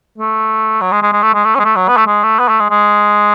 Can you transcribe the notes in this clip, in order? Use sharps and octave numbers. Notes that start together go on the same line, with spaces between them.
A3
F#3
G#3
G#3
G#3
A3
G#3
A3
C#4
G#3
A3
F#3
B3
A3
G#3
A3
B3
A3
G#3
G#3